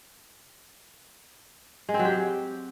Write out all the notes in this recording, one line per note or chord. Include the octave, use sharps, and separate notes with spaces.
G#3
C4
F#3
G4